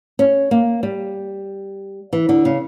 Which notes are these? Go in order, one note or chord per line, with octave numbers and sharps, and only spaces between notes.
C#4
A#3
G3
E3
D3
C#3